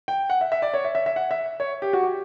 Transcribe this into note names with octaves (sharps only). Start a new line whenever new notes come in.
G5
F#5
E5
E5
D5
C#5
E5
E5
E5
F#5
E5
C#5
G4
F#4
G4